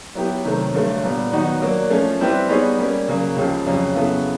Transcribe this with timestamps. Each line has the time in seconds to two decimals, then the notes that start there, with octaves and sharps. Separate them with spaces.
0.15 F#3 B3 E4 G4 B4
0.44 C3 D#3 F#3 A3
0.74 G2 D3 F#3 A3
1.03 A#2 G3 B3 D4
1.32 D#3 F#3 B3 D#4 F#4
1.62 F#3 A#3 D4
1.90 F3 A3 C#4
2.20 G3 C4 E4 G4 B4
2.49 G3 B3 D#4 G#4 C#5
2.79 G3 A#3 C#4
3.08 C#3 F#3 A#3
3.36 C#2 C#3 F3
3.66 F2 C#3 F#3
3.95 C#3 F#3 B3 E4 A4